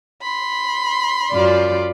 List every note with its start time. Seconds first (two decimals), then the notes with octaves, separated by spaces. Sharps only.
0.22 B5 C6
1.31 F#2 F4 D5